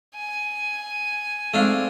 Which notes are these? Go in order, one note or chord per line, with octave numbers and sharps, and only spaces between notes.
G#5
G#3 A3 C4 D4 F5